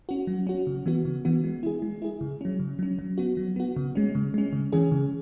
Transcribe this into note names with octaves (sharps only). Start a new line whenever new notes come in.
C#4 F#4
F#3
C#4 F#4
C#3
E3 B3 F#4
C#3
E3 B3 F#4
G#3
E4 G#4
G#3
E4 G#4
C#3
F#3 C#4
C#3
F#3 C#4
F#3
B3 F#4
F#3
B3 F#4
C#3
G#3 C#4
C#3
G#3 C#4
C#3
E3 C#4 G#4
C#3